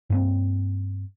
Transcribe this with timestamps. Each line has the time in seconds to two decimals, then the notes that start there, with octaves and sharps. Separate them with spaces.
0.10 G2 A#3 C4